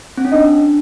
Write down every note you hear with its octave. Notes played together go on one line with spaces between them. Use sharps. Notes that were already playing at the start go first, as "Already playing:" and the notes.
C4
C#4
D4 D#4